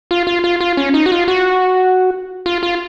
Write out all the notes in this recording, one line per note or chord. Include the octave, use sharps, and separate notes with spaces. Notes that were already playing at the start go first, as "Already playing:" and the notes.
F4
F4
F4
F4
C#4
D#4
F#4
F4
F#4
F4
F4